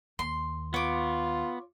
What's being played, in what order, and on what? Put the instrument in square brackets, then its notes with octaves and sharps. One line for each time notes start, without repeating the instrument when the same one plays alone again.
[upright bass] D#2 [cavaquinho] C6
[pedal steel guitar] B3 [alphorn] F4 [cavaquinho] C#5 D6